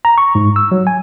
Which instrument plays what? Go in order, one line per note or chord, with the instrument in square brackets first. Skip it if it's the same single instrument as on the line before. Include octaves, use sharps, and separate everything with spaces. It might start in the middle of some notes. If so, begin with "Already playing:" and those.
[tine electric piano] A#5
C#6
G#2
E6
F#3
G#5